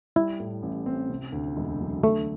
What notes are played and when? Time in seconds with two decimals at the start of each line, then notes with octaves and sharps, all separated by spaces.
0.16 G3 E4
0.40 A2
0.62 A1
0.86 C4
1.09 C3
1.32 D2
1.56 E1
1.81 F#3
2.03 D3 A3